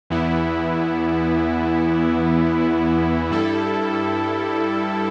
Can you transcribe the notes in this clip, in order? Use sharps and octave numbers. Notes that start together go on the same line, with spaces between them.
E2 E3 B3 E4
G2 G3 E4 A4